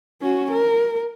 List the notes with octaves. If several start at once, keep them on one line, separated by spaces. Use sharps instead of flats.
C#4 F#4
A#4